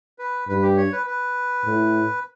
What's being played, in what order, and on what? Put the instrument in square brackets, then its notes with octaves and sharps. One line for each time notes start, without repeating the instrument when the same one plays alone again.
[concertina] B4
[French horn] G2 [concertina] B4
[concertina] G4
C#5
B4
B4
[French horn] A2